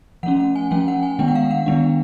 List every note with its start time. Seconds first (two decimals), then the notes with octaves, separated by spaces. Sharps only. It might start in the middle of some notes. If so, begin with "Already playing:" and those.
0.23 F3 A3 C#4 F#5
0.40 F#5
0.55 G#5
0.71 F3 A3 C#4 G5
0.88 F#5
1.03 G#5
1.19 D#3 G#3 B3 D4 G5
1.28 F#5
1.35 F5
1.51 F#5
1.66 D#3 G#3 B3 D4